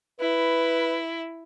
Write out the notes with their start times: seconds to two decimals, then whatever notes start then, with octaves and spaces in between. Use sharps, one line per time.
0.20 E4 B4